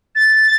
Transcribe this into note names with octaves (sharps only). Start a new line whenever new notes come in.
A6